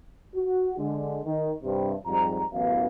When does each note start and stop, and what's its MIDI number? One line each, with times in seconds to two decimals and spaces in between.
0.35 0.75 66
0.77 1.19 50
0.77 1.19 56
1.24 1.51 51
1.63 1.93 43
1.63 1.93 48
2.06 2.41 41
2.06 2.41 44
2.06 2.41 55
2.06 2.41 82
2.52 2.87 33
2.52 2.87 42
2.52 2.87 52
2.52 2.87 59
2.52 2.87 77